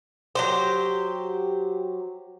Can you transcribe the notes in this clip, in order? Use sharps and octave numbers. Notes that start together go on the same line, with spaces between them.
F#3 G4 C5